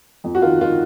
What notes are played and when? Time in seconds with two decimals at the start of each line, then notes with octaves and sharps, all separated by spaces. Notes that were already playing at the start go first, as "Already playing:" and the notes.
0.24 F2
0.35 F#4
0.42 D#3 F4
0.61 D#3 F4